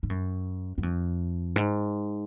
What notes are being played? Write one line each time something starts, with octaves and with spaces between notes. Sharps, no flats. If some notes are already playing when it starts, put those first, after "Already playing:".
G#2
F#2
F#2
F2
G#2